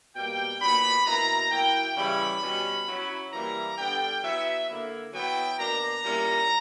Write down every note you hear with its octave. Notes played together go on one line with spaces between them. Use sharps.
B2 G3 A#3 G5
A#2 F#3 B3 D4 B5
B2 A#3 E4 A#5
F#3 A#3 E4 G5
C#3 E3 G3 C#4 E4 B5
B2 G3 C#4
F#3 C#4 E4
E3 G3 A#3 E4 A#5
D3 G3 B3 D4 G5
F#3 B3 E4 E5
D3 A#3 E4
F#3 B3 E4 G5
B2 A#3 D4 A#5
A#2 G3 C#4 E4